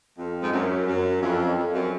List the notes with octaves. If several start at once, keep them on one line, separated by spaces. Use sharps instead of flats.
F2
G#2
F#2
F#2
F2
F2
F#2